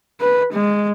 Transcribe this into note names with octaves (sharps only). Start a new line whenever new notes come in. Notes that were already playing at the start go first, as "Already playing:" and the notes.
B4
G#3